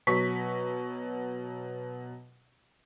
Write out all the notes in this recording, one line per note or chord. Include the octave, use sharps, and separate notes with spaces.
B2 F#3 C#6 B6